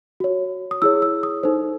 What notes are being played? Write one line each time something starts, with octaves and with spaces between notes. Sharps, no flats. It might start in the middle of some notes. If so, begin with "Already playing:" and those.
F#4 C#5
D#6
E4 G#4 C#5 E6
E6
D#6
D#4 A4 C5